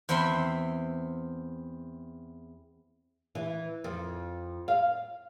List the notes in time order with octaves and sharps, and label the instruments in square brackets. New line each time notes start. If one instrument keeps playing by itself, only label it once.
[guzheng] E2 C4 E5 B5 C6
[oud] E3
F2
F5